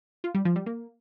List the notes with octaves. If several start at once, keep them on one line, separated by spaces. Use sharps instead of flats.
F4
G3
F3
G3
A#3